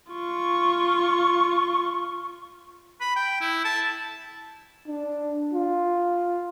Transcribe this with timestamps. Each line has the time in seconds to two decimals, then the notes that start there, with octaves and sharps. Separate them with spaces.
0.12 F4 C#6
3.01 B5
3.16 G5
3.41 E4
3.65 A5
4.88 D4
5.54 F4